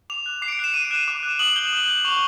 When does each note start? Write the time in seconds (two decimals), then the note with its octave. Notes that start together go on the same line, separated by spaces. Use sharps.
0.10 D6 F7
0.26 F#6
0.42 D6 C7
0.48 D7
0.52 C#7
0.59 F#6 E7
0.74 D6 D#7
0.85 D7
0.91 F#6 D#7
1.08 D6
1.23 F#6
1.39 D#6 F#7
1.56 G6 G7
1.73 D#6
1.88 G6
2.05 C#6 F7